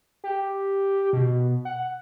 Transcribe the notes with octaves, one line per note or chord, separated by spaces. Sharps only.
G4
B2
F#5